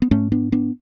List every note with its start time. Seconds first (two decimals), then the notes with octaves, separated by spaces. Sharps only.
0.02 B3
0.11 G#2 A3 C#4
0.32 B3 D4
0.52 B3 D4